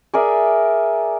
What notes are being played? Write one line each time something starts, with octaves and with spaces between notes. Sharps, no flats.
G#4 A#4 D5 E5